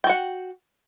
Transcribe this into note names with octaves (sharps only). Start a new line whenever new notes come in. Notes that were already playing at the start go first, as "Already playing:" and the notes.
F#4 F#5 G5